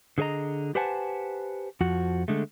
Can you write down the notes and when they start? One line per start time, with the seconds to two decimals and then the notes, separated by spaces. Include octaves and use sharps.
0.18 D3 G#4 A#4 D#5 A#5
0.75 G4 B4 C5 F#5 G#5 A5
1.81 F2 F3 F#4
2.28 D3 G#3 A3